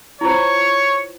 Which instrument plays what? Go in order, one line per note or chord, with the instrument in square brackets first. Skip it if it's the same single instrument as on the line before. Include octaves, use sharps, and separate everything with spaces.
[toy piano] E4 F4 C5 [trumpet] C#5